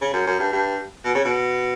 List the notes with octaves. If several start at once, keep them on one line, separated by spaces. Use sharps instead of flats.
C#3
F#2
F#2
G2
G2
B2
C#3
B2